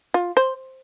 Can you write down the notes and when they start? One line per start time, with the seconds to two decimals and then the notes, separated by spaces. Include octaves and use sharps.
0.14 F4
0.37 C5